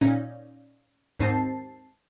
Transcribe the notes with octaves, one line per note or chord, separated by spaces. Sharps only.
A#2 C#4 D#4
D#2 G#2 C4 D#4 A5 C7